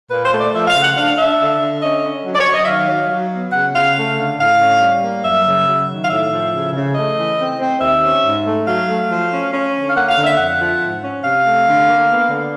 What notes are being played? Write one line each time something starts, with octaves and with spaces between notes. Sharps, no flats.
A#2 B4
C5
A3
D5
F3 E5
F5
C#3
F#5
D4 F5
D4 E5
D3
D3
C#4 D#5
C#4
F#3
D5
C#5
F#3
D#5
E5
D#3 F5
F#3
F#3
B3
C#3 F#5
C#3 F5
A3
D3
A2 F5
C#4
G3
A#3
F#2 E5
C#3
F#3
D#3
F5
A2 E5
F3
C#3
C#3
A3 D#5
E3
C4
C4
D#2 E5
C#4
G#2
A3
F#3 F5
A3
F3
C#4
C#4
D3
F5
A#3 F#5
F5
D3
E5
F2 F#5
F3
G#2
C#4
C3 F5
A3
D3
A#3
B3
D3